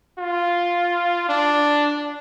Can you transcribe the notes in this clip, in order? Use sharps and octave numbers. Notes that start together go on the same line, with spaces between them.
F4
D4